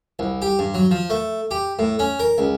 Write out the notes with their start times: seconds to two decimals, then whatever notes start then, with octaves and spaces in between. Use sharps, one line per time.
0.19 C2
0.42 G4
0.59 G2
0.74 F#3
0.91 F3
1.10 A3
1.51 G4
1.79 A2
1.99 C#4
2.19 A#4
2.38 C#2